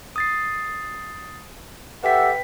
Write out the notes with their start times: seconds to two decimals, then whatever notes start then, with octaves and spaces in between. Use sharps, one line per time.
0.16 D#6 A6 C7
2.03 G4 A4 B4 E5 F#5 G5 B6